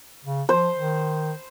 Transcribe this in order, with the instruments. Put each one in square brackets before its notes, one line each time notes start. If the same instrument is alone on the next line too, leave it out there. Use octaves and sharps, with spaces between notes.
[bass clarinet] C#3
[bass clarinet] F3 [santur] C5
[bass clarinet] D#3